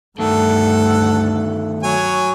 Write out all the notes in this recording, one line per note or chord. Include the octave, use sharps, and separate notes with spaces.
D2 G2 D#3 A3 A4 F#5
F#3 C#5 G#5